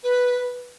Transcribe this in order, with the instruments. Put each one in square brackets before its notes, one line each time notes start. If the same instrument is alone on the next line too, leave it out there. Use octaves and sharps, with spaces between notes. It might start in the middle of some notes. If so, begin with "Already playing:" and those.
[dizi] B4